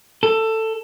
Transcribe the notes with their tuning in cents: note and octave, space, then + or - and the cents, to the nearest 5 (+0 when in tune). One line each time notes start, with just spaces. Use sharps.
A4 +15